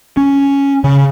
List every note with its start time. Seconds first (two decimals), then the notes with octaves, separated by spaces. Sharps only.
0.17 C#4
0.84 C#3